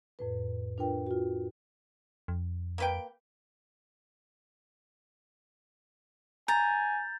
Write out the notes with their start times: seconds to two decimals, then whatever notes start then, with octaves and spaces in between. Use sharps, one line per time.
0.19 F2 A2 B4
0.78 D4 F4 A#4 B4 G5
1.07 F4 F#4
2.28 F2
2.78 A#3 B4 G5
6.48 G#5 A#5 G6 A6